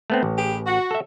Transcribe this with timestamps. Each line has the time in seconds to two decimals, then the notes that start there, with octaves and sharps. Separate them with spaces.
0.10 A3 B3 C4
0.23 A1
0.37 G4 G#4 B4
0.66 F#4
0.91 A4 E5